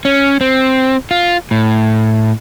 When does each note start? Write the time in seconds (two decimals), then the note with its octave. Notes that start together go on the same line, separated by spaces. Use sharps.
0.05 C#4
0.41 C4
1.11 F4
1.51 A2